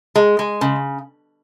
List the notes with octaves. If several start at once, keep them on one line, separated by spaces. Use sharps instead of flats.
G#3
G#3
C#3